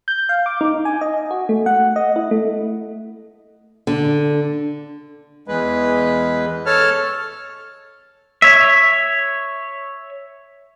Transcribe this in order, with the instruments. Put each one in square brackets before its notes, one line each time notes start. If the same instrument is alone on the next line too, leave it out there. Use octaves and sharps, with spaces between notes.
[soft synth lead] G6
F5
D6
D#4
G#5
D#5
F#4
A3
F#5
D#5
E4
A3
[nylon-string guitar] D3
[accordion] E2 G#3 B4
A4 C#5 A5 F6
[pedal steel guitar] C#5 E5